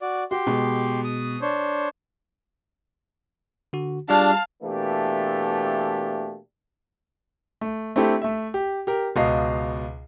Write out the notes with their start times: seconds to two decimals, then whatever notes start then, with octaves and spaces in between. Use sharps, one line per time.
0.01 F#4 D5
0.31 F#4 G4 C6
0.47 B2 G#3
1.04 D#6
1.41 D4 C5 C#5
3.73 D3 F#4
4.09 G3 D4 F4 G#4 F5 A5
4.63 B2 E3 A3 A#3 D4 G4
7.61 A3
7.96 A3 C4 D4 E4 G4 A4
8.22 A3 E5
8.54 G4
8.87 G4 A#4
9.16 C#2 B2 D#5 F5 C7